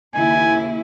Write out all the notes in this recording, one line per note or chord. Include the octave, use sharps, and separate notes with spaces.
D#2 C#3 E4 G#5